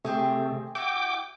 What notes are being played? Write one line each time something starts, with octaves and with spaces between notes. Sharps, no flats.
C3 A3 C4 G4 G#4
E4 F#4 G4 G5 D6